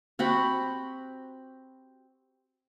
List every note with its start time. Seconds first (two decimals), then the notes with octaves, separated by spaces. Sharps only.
0.19 C4 F#4 G4 B5